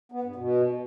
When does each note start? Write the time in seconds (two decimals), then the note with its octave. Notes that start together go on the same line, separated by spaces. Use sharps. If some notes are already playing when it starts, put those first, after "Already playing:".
0.12 B3
0.24 G2
0.36 B2